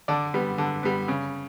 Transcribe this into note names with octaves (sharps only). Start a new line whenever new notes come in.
D3 D5
G3 B3
D3
G3 B3
C#3